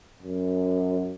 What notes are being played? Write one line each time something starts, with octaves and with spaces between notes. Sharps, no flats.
F#2